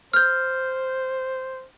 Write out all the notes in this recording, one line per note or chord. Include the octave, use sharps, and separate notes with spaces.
C5 F6 G6